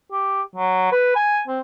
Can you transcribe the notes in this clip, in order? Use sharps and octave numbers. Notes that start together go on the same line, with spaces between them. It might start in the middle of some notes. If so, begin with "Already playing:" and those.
G4
F#3
B4
G#5
C4